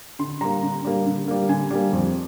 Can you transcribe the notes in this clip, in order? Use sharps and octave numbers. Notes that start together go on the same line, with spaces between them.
D3 C6
G3 A#3 A#5
D3
G3 A#3
D3
G3 A#3
D3 G#5
G3 A#3
F2